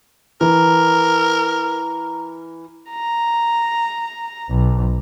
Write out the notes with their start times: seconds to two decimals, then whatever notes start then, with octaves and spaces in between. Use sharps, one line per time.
0.41 E3 A#4 A#5
2.90 A#5
4.50 B1